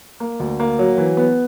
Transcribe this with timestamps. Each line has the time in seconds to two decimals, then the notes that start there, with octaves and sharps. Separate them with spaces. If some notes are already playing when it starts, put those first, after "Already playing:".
0.20 A#3
0.40 D2
0.60 A#3
0.79 F#3
0.98 E3
1.17 B3